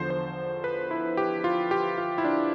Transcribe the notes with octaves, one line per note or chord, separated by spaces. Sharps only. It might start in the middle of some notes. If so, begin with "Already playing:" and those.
Already playing: E2 D3 F3 C5
C5
B4
E4
G4
F4
G4
F4
E4
D4